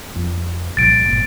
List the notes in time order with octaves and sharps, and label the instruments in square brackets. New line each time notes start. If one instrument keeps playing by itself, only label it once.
[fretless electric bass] F2
[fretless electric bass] C2 A#2 F3 [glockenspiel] A6 D7
[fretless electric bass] G1 A#2